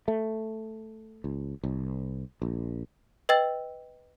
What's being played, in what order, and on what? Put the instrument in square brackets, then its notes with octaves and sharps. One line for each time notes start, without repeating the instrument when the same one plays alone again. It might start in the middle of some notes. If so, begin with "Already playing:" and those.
[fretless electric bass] A3
C#2
C2
A#1
[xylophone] B4 D#5 G5 E6 A6